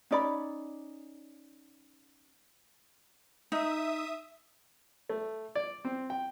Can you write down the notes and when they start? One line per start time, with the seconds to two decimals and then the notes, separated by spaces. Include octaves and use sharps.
0.11 C#4 D#4 D5 B5
3.52 D#4 E5 D#6
5.09 A3
5.55 D5
5.85 C4
6.10 G5